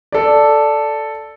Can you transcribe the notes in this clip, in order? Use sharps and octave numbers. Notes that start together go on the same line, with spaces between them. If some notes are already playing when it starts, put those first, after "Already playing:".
A4 D5